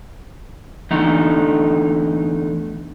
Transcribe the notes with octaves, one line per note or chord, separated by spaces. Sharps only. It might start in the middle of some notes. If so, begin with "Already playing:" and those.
E2 D3 A3 D#4